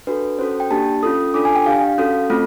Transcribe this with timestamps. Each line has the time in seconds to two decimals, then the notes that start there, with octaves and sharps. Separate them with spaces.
0.07 D4 F#4 A4 B4
0.39 C#4 F#4 A4 C5
0.60 G5
0.71 A#3 D4 G4 A5
1.03 C#4 F4 A4 D#6
1.34 D4 F4 A4 D6
1.45 G#5
1.56 G5
1.66 D4 G4 F5
1.98 C#4 F#4 A4
2.30 A3 C4 F4 A4